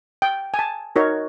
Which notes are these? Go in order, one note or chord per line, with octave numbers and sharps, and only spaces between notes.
G5
G#5
A5
D#4 F#4 A#4 C#5